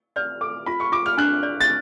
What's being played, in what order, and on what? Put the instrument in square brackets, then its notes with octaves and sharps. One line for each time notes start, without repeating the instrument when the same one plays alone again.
[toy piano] D5 [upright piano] F6
[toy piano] A4 [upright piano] D6
[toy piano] F4 [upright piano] B5
[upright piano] C#6
[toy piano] F4 [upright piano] D6
[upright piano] F6
[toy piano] D4 [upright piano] F#6
[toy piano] D5
[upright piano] A6